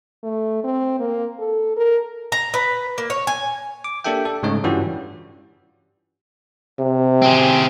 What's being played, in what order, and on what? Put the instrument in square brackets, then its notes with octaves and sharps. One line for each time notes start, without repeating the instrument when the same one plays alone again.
[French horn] A3
C4
A#3
A4
A#4
[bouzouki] A#5
B4
A#3
C#5
G#5
[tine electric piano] D6
A#3 D4 G4 A4 E5 G5
A4
G#2 C#3 G#3 A3 D#4 C#5
G2 E3 G3 C#4 F4 F#4
[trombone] C3
[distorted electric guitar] C4 G#4